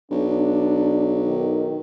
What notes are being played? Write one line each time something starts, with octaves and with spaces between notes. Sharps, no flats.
B1 D4
D#3